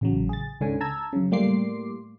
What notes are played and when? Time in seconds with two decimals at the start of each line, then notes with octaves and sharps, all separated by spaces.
0.01 A1 C#3 F#3
0.29 G#4 A6
0.60 C#2 G#2 D3 C#4 G#5
0.81 A5 A#5 E6 G#6
1.13 F#2 C#3
1.31 A2 G3 A#3 C6 D6 C7